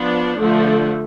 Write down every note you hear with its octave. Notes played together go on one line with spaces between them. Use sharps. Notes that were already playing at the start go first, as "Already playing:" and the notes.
Already playing: F3 B3 D4
D3 F3 A3